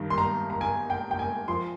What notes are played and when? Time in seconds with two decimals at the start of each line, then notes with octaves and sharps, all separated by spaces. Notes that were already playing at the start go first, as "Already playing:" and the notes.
Already playing: G2 D#3 G3
0.10 C6
0.18 A#5
0.50 A#5
0.61 G#5
0.90 G5
1.11 G5
1.19 G#5
1.48 F3 C6